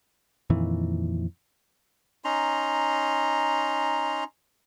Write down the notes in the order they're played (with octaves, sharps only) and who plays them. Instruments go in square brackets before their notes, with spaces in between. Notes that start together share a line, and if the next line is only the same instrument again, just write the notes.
[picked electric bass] F2 A#2 D#3 E3
[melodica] C#4 D#4 A#5 C6